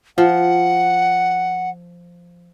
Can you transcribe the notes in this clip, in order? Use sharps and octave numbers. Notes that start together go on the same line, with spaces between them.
F3 F#5